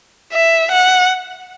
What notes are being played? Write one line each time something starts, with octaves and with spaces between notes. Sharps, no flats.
E5
F#5